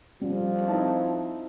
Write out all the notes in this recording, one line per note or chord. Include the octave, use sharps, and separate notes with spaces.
F3 G3
C4 D#4 E4 A5